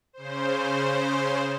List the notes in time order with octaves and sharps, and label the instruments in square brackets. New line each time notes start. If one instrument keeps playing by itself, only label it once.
[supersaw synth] C#3 C5